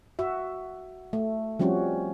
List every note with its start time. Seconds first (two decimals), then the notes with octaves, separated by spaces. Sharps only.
0.19 F#4 E5
1.13 A3
1.59 F3 G3 C4 C#4 F#4